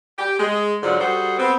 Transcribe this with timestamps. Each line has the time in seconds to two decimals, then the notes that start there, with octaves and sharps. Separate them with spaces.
0.19 G4
0.39 G#3
0.82 G#2 D3 F3 F#3
1.00 G3 F#4 G#4 A4 C5
1.39 B3 C4